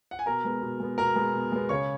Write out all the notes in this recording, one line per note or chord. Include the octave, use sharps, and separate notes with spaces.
F#5
G#5
B2 A#4 A#5
G#3 B3
B2
G#3 B3
B2 A#4 A#5
G#3 B3
B2
G#3 B3
C#3 C#5 C#6